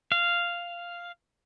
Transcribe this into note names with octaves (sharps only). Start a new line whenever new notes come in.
F5